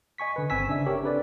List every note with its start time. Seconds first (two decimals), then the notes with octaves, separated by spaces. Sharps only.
0.18 D#5 G#5 C#6 B6
0.36 D3 B4
0.50 G1 C4 G#5 E6 B6
0.67 C#3 D4 E5
0.86 G4 A#4 C#5
1.02 C4 D4 A4 B4 D5